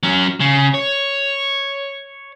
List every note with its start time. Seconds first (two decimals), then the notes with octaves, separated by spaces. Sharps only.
0.03 F#3 C#4
0.40 C#3
0.74 C#5